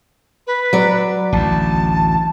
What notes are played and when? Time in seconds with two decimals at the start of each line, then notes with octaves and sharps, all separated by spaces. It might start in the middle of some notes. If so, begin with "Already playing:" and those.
0.47 B4
0.73 F#3 D5
1.33 A1 D2 A5